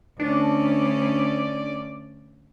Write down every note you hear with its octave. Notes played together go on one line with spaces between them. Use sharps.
D2 C#4 D4 D5